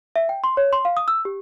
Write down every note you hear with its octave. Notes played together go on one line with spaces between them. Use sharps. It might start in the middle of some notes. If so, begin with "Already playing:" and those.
E5
G5
C6
C#5
C6
F5
D#6
E6
G4